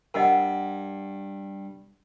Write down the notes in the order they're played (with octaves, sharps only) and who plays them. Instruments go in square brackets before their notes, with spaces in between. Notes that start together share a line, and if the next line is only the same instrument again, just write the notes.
[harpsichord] G2 [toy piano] A#4 D#5 F#5